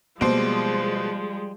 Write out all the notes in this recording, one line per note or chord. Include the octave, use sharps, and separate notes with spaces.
B2 F3 G3 G#3 A#3 C5